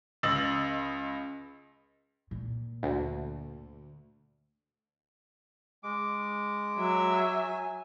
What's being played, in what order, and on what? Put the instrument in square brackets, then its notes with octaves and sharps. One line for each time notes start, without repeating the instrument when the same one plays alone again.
[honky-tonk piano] C#2 D#5 E6 A6 F#7
[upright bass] A#2
[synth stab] D2
[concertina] G#3 D6
[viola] F#3 E5
[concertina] G#5